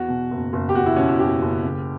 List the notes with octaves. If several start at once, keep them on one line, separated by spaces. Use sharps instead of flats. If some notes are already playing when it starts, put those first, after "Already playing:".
Already playing: E2 F#4
B2
F#1
F#1
G4
E2 F#4
E4
B2 C#4
E4
F#1 G4
F#1
C#3